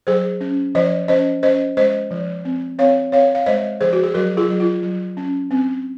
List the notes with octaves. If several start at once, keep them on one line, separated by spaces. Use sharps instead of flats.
F#3 G#4 C5
C#4
F3 C5 D#5
C#4 C5 D#5
C#4 C5 D#5
G#3 C5 D#5
F3
C4
C4 C#5 F5
C4 C#5 F5
F5
G#3 C5 D#5
F3 G#4 C5
F#4
G#4
F#3 F#4 A#4
F4 G#4
F#3
F4
F#3
C#4
C4